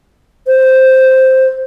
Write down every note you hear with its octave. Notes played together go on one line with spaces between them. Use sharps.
C5